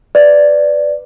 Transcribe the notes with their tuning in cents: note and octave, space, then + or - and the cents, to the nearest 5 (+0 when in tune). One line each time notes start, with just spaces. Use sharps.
B4 +20 D5 +0